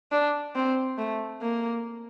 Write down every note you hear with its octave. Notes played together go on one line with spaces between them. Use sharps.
D4
C4
A3
A#3